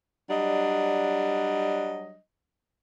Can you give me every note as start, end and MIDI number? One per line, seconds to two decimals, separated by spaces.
0.30 2.18 54
0.30 2.18 55
0.30 2.18 62
0.30 2.18 75